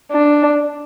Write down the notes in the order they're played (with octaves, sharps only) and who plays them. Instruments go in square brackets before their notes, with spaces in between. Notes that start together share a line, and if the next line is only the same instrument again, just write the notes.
[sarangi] D4